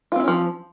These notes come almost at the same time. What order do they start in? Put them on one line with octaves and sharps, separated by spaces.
F4 C4 E4 C#4 F3